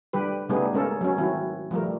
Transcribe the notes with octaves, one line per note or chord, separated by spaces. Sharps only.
D3 G3 G4 B4
C#3 G3 A3 B3 D#4 G#4
G#3 A#3 C#4 A4 A#4
F#3 C#4
D#3 C4 E4 F#4
F3 G3 A3 A#4